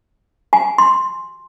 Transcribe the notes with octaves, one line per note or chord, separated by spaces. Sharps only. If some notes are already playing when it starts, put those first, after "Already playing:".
G#5
C6